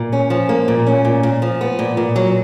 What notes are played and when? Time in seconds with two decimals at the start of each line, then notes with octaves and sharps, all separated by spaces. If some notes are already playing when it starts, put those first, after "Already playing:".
Already playing: A#2
0.12 C#4
0.30 F3
0.49 A#3
0.68 A#2
0.87 C#4
1.05 A#2
1.23 A#2
1.42 F3
1.61 B3
1.79 A#2
1.97 A#2
2.16 F#3